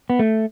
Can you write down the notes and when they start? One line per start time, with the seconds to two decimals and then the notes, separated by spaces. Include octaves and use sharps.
0.10 B3
0.19 A3